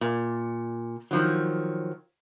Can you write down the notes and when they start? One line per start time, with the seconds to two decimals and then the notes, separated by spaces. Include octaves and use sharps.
0.01 A#2
1.11 D#3 F3 F#3